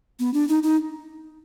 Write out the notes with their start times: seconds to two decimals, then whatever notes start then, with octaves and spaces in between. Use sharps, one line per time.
0.19 B3
0.34 D4
0.49 D#4
0.63 D#4